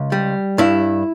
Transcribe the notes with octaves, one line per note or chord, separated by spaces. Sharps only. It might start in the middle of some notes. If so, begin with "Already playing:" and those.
Already playing: C#2
G3
G2 E4